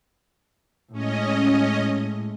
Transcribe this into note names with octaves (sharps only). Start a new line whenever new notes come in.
A2 G#3 C#4 D#5